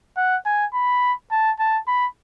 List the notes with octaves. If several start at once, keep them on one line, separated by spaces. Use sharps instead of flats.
F#5
G#5
B5
A5
A5
B5